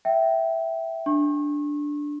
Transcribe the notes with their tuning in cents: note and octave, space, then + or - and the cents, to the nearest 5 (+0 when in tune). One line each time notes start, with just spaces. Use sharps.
E5 +0 G5 -15
D4 +0 C#6 -35